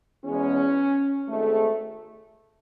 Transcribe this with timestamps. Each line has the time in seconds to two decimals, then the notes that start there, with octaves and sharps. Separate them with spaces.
0.24 E2 B2 G#3 C#4
1.29 G#1 G#2 G#3 A3